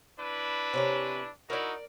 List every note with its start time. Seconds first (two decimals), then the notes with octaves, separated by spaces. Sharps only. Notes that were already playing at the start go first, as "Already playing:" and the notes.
0.19 D4 E4 B4
0.73 C3 C#4 A#5
1.50 D#4 E4 F#4 A#4 D5